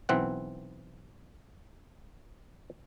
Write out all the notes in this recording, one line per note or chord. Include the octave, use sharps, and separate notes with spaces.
B1 E3 C4 F#5